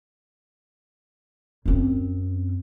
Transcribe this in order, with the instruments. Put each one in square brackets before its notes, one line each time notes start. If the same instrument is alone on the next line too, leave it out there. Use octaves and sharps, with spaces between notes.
[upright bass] F#2 C4